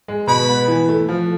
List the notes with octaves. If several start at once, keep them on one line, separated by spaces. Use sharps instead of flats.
G#3
B2 B5
B3
E3
A3
F3